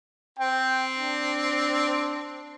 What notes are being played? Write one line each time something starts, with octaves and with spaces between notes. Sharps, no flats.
C4 G5
D4